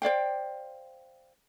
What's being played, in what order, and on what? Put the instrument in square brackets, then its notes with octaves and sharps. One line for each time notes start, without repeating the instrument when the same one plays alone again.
[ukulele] C5 D5 F5 G5